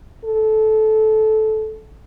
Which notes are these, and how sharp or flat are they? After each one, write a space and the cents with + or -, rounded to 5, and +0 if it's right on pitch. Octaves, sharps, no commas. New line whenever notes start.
A4 -15